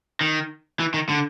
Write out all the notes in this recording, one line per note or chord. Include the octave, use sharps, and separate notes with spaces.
D#3
E3
D#3
D3